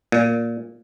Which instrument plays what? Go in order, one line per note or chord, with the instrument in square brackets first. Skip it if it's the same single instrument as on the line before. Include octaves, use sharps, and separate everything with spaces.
[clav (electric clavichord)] A#2